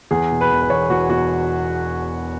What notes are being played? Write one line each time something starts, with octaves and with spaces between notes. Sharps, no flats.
E2 G#4
B2
B4
E1
B4
E1 C#5
E2 F#4
B2 F#4